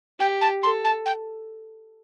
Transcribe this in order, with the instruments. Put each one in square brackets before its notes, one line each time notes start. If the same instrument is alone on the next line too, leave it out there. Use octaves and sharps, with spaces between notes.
[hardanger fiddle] G4 [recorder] G5
[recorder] A5
[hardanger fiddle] A4 [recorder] C6
[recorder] A5
G5